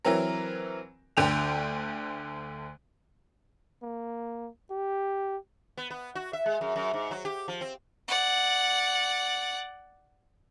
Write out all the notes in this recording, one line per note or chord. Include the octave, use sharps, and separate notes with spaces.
E3 F#3 C4 A#4
D2 D3 G5 F7
A#3
G4
B3
B3
F#4
E5
G#3
F#2
F#2
G#2
F#3
G4
F3
C4
D5 F#5